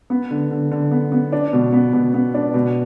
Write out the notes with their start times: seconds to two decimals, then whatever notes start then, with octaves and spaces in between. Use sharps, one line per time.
0.10 B3
0.31 D3
0.51 D3
0.71 D3
0.91 B3
1.12 B3
1.32 D4
1.53 B2
1.72 B3
1.93 B2
2.14 B3
2.34 D4
2.54 B2